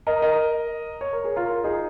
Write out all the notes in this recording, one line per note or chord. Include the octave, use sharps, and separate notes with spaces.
A#4 D#5
A#4 D#5
C#5
A#4
G#4
F4 A#4
D#4 G#4